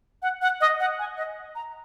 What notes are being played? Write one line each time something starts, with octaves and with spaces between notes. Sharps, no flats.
F#5
F#5
D#5
F#5
G#5
D#5
A#5